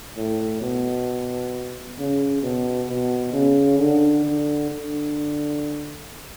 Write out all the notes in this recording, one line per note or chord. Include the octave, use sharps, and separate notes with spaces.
A2
B2
C#3
B2
B2
C#3
D3
D3
D3